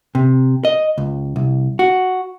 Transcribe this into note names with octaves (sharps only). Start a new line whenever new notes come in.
C3
D#5
C#2
C2
F#4